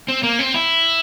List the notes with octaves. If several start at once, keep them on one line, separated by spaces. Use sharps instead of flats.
C4
A#3
C4
E4